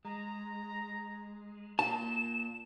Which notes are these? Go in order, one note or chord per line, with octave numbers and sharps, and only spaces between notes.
G#3 A#5
A#3 F4 A5 E7